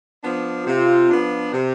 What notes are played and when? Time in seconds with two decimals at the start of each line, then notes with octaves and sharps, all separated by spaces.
0.22 F3 B3 D4
0.65 C3 F4
1.09 F3 B3 D4
1.52 C3